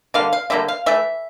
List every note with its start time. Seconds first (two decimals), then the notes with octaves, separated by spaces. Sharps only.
0.14 D3 G3 A#3 F5
0.33 F5
0.50 D3 G3 A#3 E5
0.68 F5
0.86 E3 A3 E5